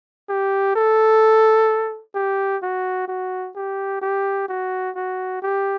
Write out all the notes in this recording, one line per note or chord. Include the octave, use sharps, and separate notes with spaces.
G4
A4
G4
F#4
F#4
G4
G4
F#4
F#4
G4